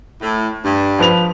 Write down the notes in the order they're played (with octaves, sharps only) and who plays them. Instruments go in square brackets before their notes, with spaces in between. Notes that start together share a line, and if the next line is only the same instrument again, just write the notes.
[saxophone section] A2
G2
[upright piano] F3 B4 F7